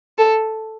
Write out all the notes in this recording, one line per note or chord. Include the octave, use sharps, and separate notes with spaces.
A4